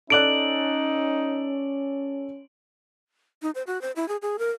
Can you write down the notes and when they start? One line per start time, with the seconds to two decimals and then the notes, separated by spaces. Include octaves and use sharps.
0.10 C#4 D#4 A4 D5 F#6 D7 F#7
3.42 D#4
3.55 C5
3.67 F#4
3.81 C5
3.96 E4
4.08 G#4
4.22 G#4
4.39 A#4